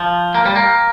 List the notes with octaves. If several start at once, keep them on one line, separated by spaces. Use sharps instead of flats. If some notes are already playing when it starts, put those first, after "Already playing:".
Already playing: F3
A#3
G3
A#3